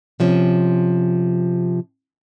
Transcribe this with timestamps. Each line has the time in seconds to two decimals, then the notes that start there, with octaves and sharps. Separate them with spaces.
0.20 C3 F3 C#4